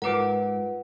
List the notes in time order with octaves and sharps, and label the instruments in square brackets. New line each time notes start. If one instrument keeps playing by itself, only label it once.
[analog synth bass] G#2 [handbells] F4 B4 F#5 [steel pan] A#4 D6